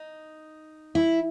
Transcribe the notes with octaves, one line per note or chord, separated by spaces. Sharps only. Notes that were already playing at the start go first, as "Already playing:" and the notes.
Already playing: D#4
E4